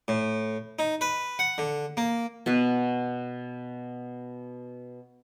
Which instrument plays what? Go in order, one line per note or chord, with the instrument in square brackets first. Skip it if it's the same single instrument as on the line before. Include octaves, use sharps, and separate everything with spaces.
[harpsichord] A2
D#4
B4
F#5
D3
A#3
[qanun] B2 B4